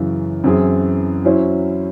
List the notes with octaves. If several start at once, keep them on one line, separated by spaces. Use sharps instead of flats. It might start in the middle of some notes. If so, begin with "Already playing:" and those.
Already playing: F#2 C#3 E3
F#2 E3 C4 E4 G#4
F#3 C#4 E4 C5